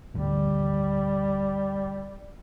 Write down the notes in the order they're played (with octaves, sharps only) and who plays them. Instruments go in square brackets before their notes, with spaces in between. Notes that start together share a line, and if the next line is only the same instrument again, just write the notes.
[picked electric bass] G#1 D2 D3 [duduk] G3